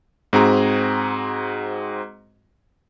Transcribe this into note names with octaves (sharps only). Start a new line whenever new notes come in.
G#2 C4 F#4 G#4 A#5